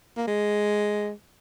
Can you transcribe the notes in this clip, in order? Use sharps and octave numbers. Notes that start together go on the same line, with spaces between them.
A#3
G#3